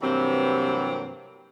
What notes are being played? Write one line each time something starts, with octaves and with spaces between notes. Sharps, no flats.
G2 C3 E3 F#3 A#3 C4